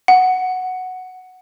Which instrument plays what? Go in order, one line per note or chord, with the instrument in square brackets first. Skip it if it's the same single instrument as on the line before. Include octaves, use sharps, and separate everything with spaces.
[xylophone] F#5